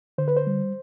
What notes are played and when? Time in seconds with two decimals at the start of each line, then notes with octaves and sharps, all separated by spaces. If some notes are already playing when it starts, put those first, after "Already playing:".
0.18 D3 C5
0.28 B4
0.37 C5
0.47 G3